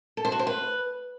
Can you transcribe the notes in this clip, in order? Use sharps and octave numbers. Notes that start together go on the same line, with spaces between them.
A4
C5
F#4
C5
B4